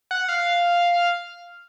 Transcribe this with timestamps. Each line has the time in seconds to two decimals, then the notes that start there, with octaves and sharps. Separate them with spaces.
0.11 F#5
0.29 F5